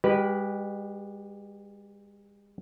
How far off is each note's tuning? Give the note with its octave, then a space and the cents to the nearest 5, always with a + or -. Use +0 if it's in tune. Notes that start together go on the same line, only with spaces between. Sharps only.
G#3 -45 G4 -20 B4 -5